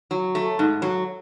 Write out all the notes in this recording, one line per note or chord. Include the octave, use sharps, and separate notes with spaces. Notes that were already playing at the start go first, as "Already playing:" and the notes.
F#3
A3
G#2
F#3